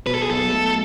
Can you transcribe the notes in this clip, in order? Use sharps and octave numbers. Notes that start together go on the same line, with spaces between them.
B2 B4
A4
G#4
B1 A4
A3